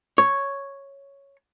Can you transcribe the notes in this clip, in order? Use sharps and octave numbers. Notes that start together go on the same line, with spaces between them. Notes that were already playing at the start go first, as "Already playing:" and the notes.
C#5